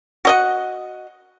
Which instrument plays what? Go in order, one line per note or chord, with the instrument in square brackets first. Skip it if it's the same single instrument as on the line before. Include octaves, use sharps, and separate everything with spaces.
[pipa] F#4 D#5 F#5